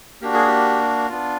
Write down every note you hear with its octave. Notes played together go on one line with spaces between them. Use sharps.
A#3 D4 F#4 G4
G#4
G4
B3 D4 F4